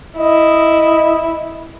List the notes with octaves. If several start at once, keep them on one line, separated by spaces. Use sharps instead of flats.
E4 D#5